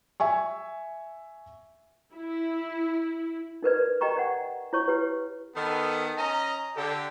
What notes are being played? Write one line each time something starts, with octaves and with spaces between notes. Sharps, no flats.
E5 G#5 C#6
E4
D#4 A#4 B4 D5
G4 D#5 G5 A#5 C#6
D5 F#5
E4 C#5 C#6
G4 B4
D#3 B3 A4
C#4 D#5 A#5
D3 G4 A4